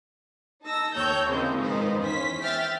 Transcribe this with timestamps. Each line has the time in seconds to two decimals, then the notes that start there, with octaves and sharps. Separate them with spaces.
0.64 D#4 A5 E6 A#6
0.95 D#2 A4 C#5 G5 E6 G6
1.29 C#3 E3 F3 G#3 A#3 C4
1.59 G#2 D#3 F3 D#4 B4 C5
1.99 E2 C#4 C5 B6
2.42 E5 G5 F6 A6 B6